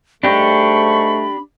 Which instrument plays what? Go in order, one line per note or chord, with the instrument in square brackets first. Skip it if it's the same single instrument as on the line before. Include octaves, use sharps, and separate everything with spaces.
[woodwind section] G#2 C#6 [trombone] A3 [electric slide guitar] D4 G4 [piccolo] B5